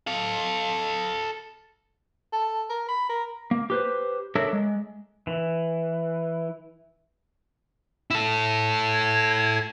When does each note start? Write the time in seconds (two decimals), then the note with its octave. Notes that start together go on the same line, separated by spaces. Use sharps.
0.07 A4 F5
2.33 A4
2.70 A#4
2.89 B5
3.10 A#4
3.51 A#3
3.70 G4 B4 C5
4.35 D4 A4 A#4 C#5 E5
4.53 G#3
5.27 E3
8.10 E4 A4
8.90 G#6